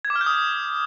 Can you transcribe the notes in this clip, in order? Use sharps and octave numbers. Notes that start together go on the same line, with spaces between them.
G#6
D6
F6
G6
D#6